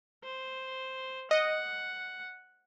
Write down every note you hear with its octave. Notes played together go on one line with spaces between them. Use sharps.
C5
D#5 F#5